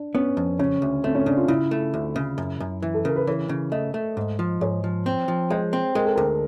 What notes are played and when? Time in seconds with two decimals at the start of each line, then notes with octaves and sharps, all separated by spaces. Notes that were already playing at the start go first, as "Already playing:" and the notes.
Already playing: D4
0.14 B3 C#4
0.37 F2
0.59 C#3 C#4
0.82 D2
1.04 A3 C4
1.15 C#4
1.26 C#3 D4
1.37 F4
1.48 C#3 E4
1.71 A3
1.94 D2
2.16 C#3
2.38 F#2
2.60 F#2
2.82 E3
2.94 A4
3.05 C#3 A#4
3.16 B4
3.27 E3 C#5
3.49 C#3
3.72 A3 D#5
3.94 A3
4.17 G#2
4.39 F3
4.61 G#2 C#5
4.84 F3
5.06 C4
5.28 F3
5.50 G#3 C5
5.73 C4
5.95 G#3 A#4
6.06 A4
6.16 D2 A#4